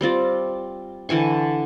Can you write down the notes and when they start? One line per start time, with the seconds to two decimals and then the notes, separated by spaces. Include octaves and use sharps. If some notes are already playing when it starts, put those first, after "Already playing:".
0.01 G3 C4 F4 D5
1.09 D3 E3 G#5 C#6